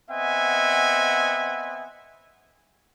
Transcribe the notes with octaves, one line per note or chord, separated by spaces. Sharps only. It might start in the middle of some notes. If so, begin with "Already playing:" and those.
B3 C4 D#5 E5 F#5 G#5